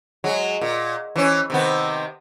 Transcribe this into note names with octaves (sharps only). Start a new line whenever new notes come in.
F#3 G#3
A#2
E3 C#4
C3 D#3 B3